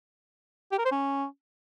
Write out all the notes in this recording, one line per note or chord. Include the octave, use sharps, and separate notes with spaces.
G4
A#4
C5
C#4